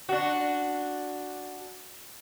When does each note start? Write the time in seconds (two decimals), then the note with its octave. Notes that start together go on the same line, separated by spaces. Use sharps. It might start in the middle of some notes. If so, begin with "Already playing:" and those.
0.09 D4 F#4